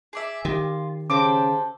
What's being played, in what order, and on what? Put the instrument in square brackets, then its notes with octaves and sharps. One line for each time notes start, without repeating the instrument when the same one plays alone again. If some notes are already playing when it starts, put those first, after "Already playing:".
[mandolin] G#4 D5 E5
[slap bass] D#3 [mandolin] F4 [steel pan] G4
[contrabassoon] C#3 [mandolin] G4 A4 C5 [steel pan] D6